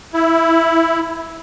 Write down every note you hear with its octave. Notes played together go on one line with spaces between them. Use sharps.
E4